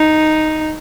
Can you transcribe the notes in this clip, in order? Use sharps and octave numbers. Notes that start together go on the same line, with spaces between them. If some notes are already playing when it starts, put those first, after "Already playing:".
Already playing: D#4